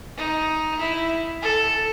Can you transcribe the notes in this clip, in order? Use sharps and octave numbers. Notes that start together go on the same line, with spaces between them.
D#4
E4
A4